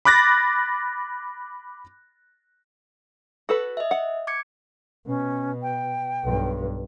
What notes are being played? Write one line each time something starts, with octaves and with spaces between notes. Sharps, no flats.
B5 D6 F#6 A6 A#6
F#4 A4 B4
D#5 E5
F#5
D6 G#6 C#7
B2 C#4
G5
B1 G2